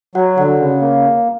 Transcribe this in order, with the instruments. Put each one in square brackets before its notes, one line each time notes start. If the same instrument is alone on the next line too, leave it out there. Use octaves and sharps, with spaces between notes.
[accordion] F#3 [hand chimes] F#4 F#5
[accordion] D3 [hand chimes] F#4 F#5
[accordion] C#3
A#3